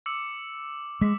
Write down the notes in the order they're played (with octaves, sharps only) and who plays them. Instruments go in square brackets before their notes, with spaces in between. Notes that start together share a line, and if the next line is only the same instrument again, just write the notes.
[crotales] D6 E6 C#7
[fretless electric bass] G#3 [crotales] D6 B6